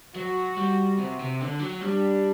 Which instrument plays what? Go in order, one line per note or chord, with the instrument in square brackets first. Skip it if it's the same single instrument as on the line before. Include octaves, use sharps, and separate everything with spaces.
[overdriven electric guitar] F#3 [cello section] F#4
[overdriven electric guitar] G3
C3
C3
D3
F#3
[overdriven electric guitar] G3 [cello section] D4